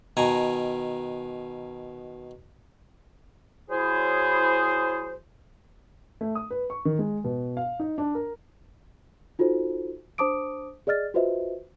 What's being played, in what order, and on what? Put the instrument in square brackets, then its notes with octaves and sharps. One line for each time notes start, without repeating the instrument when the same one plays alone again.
[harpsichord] B2 D#3 G#5 A#5
[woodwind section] F#3 E4 G#4 C5
[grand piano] A3
D#6
B4
C#6
D#3
G#3
B2
F5
D#4
D4
A#4
[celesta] D#4 F4 F#4 A4 C5
D4 C5 A5 D6 D#6 D7
G#4 D5 D#5 F6 A6
F4 F#4 B4 C5 D#5 E5